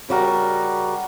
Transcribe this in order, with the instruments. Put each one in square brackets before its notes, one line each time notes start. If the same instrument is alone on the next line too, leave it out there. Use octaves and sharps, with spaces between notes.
[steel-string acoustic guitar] C#3 G3 F#4 A#4